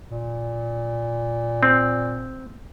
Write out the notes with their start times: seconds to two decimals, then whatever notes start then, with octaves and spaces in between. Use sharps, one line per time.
0.10 A#2
1.63 C4